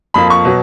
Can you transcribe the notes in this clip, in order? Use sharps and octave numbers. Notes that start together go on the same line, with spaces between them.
F2 F3 A#3 B5
C#6
B2 F#3